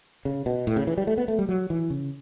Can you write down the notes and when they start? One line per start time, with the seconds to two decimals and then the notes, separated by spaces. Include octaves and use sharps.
0.25 C#3
0.46 B2
0.67 A2
0.76 C#3
0.87 E3
0.98 G3
1.07 A3
1.18 B3
1.28 A3
1.39 G3
1.49 F#3
1.70 E3
1.90 C#3